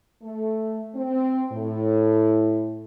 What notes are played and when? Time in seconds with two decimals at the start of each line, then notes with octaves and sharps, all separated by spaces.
0.23 A3
0.95 C4
1.52 A2